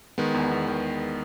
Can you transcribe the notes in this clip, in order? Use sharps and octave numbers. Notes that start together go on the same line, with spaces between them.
D#3 G#3 B3
E2
E2
D#3